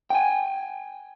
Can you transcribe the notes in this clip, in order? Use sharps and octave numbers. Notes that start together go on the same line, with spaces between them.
G5 G#5